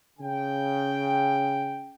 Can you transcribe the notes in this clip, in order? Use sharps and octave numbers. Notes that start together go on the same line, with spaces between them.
C#3 G5